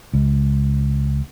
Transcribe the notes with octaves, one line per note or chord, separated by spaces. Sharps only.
C#2